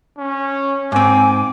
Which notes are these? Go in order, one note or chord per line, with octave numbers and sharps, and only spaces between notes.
C#4
G#2 C4 G#5 D6